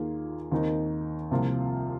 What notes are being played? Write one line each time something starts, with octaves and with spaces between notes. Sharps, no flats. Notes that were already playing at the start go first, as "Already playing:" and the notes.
Already playing: D#2 D#3 A#3 F4 G#4
D#2 D#3 C4 D#4
C2 C3 F3 A#3 F4